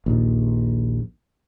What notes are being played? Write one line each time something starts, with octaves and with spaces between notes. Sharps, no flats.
A#1 D#2